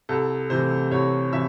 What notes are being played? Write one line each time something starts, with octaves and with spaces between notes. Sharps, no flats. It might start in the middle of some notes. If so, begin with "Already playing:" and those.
C2 A4
C3 E3 A3 C5
C2 C#5
C3 E3 E5